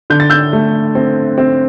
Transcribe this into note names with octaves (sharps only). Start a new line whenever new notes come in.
D3 G6
A6
E6 G6
A3
C4
C4